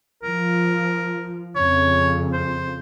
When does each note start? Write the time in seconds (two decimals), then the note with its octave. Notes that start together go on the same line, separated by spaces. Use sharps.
0.23 F3 A#4
1.56 F2 C#3 C#5
2.33 C5